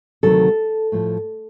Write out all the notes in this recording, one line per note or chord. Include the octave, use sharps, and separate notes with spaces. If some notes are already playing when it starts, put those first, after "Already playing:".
D2 C3 D#3 F#3 A4
A2 F3